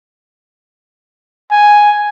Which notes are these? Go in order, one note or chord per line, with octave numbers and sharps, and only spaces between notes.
G#5